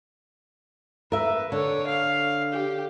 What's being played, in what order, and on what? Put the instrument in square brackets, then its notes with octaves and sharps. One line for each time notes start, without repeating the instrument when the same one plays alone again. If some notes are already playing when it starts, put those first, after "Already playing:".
[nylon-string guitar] A#4 E5 [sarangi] B4
[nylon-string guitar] D3 [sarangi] C#5
[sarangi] F5
G4